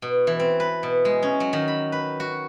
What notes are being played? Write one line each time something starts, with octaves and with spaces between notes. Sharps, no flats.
B2
E3
C4
B4
B2
G#3
C#4
F#3
D#3
B5
B4
F#4